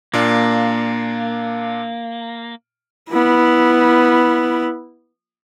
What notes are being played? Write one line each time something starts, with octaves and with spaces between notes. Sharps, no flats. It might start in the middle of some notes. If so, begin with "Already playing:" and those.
A#2 A#3 D4 F5
B3 E4